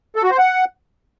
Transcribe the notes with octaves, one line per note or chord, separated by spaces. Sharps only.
A4
F#4
C5
F#5